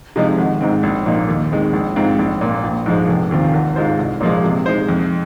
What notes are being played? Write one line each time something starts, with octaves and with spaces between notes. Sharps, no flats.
C3 F3 G#3 D#4
G#1
G#2 G#3 C4
A#1
A#2 F3 A#3 D#4
D#2
D#3 G#3 C4
A#1
G#2 G#3 C4 F4
A#1
A#2 A#3
A#1
G#2 F3 G#3
F1
D#2 D#3 C4 F4
G#1
G#2 G#3 F4 C5
C2
A#2 F3 G#3
C3
G#3 D#4 C5
F2